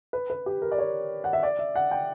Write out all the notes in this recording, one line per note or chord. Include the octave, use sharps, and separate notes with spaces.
B4
B4
G4
A#4
D5
C#5
F#5
E5
D5
E5
F#5
G5